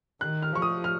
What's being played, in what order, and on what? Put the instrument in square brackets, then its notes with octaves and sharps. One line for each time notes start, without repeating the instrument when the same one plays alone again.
[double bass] D#3 [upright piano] F#6
[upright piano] F6
[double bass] F3 [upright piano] C#6
[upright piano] D#6
F6